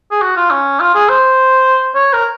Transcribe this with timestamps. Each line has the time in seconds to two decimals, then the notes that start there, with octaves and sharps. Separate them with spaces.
0.11 G#4
0.22 F#4
0.36 F4
0.51 C#4
0.80 F4
0.94 G#4
1.09 C5
1.95 C#5
2.13 A#4